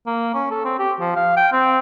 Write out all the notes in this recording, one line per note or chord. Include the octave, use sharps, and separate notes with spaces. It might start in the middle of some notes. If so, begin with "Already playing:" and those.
A#3
C#4
A4
C4
G4
F3
F5
G5
C4